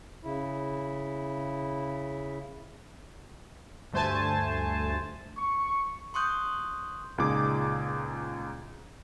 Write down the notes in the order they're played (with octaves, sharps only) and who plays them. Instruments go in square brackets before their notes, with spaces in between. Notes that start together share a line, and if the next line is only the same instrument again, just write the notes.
[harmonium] C#3 E4
[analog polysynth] D2 G2 A3 C5 G#5 A5
[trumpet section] C#6
[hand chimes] C6 C#6 D#6 F#6 G6
[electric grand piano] C#2 A#2 D#4 G#4 D6